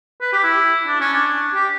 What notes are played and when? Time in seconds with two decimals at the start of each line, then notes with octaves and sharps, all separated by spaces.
0.21 B4
0.33 G4
0.44 E4
0.87 D4
1.00 C#4
1.14 D4
1.54 G4